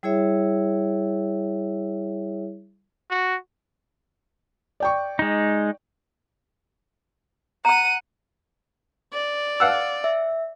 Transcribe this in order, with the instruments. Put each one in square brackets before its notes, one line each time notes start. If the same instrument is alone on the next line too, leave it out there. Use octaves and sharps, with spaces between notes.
[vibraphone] G3 E4 G#4 C#5 E5
[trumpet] F#4
[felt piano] D5 G5 C#6
[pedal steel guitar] G#3 D#4
[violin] F#5 D#7 [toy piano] A#5 B5
[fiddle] D5
[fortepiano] F5 F#5 E6
[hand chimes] E5